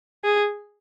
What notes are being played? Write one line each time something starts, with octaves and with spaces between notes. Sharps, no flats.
G#4